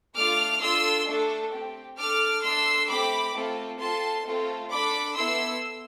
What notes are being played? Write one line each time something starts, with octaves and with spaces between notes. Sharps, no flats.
A3 D4 F4 D6 F6
D4 F4 A4 C6 E6
A3 D4 A4
C4 G4
D4 A4 D6 F6
A3 D4 A4 C6 E6
A3 C4 G4 B5 D6
A3 C4 F4 A4
C4 F4 A4 A5 C6
A3 C4 F4 A4
D4 A4 B5 D6
B3 E4 A4 C6 E6